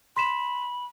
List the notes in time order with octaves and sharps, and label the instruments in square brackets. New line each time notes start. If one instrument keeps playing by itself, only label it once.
[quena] B5 [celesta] C6 B6 E7